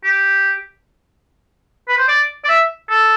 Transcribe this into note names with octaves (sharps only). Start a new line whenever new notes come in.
G4
B4
C5
D5
D5
E5
A4